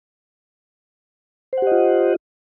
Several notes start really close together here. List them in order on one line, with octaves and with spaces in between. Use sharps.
C5 F#5 G4 D#5 F4